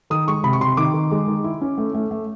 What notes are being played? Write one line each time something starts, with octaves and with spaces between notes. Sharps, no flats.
D#3 D#6
G#3 C#6
C3 B5
C#6
C3 C6
D#3 D6
D#3
G#3
D#3
E4
C#4
A3
A3
A3